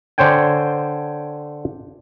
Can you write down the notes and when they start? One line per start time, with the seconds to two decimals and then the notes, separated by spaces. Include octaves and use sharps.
0.18 D3 C5 C#5 G5 G#5